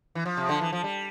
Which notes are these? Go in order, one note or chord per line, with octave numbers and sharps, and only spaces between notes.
E3
F3
C3
D3
E3
F3
G3